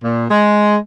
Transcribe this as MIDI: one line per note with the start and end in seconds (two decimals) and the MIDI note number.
0.02 0.24 46
0.29 0.76 56